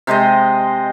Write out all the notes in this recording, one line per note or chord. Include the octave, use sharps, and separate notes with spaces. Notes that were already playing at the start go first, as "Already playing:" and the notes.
C3 G#3 C5 D#5